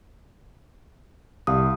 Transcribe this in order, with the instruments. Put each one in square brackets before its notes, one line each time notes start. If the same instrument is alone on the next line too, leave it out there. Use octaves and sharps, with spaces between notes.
[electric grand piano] C2 G3 F5 [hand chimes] D#6